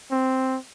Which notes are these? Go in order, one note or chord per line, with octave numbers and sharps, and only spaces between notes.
C4